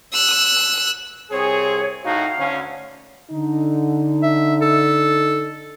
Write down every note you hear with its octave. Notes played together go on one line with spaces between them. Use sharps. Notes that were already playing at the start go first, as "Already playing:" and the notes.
E6 F#6
C2 C4 G#4 C#5
A2 D#4 F#4 F5
D2 C#4
D3 D#4
E5
A4